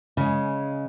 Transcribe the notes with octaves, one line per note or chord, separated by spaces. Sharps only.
C#3 G#3